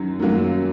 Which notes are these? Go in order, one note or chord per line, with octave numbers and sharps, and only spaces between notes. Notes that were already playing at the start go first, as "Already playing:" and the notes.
Already playing: F#2 D#3 F#3
F#2 D#3 F#3 A#3